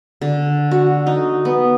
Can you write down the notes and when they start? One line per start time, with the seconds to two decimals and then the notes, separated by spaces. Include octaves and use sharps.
0.21 D3
0.71 F#4
1.07 D#4
1.45 B3